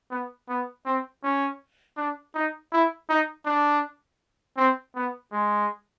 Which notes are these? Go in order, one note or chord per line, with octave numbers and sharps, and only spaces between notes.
B3
B3
C4
C#4
D4
D#4
E4
D#4
D4
C4
B3
G#3